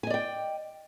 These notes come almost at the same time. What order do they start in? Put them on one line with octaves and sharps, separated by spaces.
G#5 D#5 D5 G5